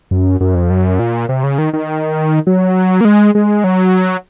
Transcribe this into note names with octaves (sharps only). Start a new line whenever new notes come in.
F#2
F#2
F2
F#2
A#2
C3
C#3
D#3
D#3
F#3
A#3
G#3
G#3
F#3